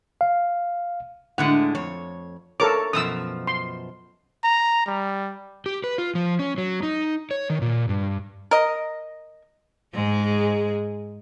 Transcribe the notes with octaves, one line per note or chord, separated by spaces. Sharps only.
F5
A2 D3 G#3 F#5
F2 C#5
A4 A#4 C#5 D6
F#2 B2 F3 D#6 E6
C6
A#5
G3
G4
B4
F4
F3
C#4
F#3
D#4
C#5
D#3
A#2
G2
A#4 D#5
G#2 G#3 G#4